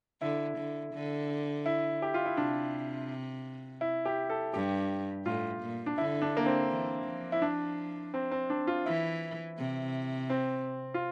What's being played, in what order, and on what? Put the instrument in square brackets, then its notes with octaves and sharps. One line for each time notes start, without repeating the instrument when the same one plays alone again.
[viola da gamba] D3 [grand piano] E4
[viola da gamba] D3
D3
[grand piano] E4
G4
F4
E4
[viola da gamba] C3 [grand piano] D4
[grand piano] E4
G4
A4
[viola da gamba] G2 [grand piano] G4
[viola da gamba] A2 [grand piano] F4
[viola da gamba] A#2
[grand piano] D4
[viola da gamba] D3 [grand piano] E4
[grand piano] D4
A#3
C4
[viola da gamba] E3
F3
[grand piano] E4
D4
C4
C4
D4
F4
[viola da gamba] E3 [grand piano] E4
[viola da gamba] C3
[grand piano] C4
F4